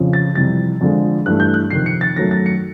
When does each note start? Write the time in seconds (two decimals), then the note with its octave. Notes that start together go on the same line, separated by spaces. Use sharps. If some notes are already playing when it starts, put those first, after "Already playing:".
Already playing: F2 C#3 F3
0.13 A6
0.35 F2 C3 E3 G3 A6
0.81 F2 D3 F3 G#3
1.26 G2 E3 A3 F#6
1.40 G6
1.54 F#6
1.71 F2 C3 D#3 C7
1.86 C#7
2.01 A6
2.16 F#2 D#3 F#3 A3 A#6
2.31 A6
2.46 C#7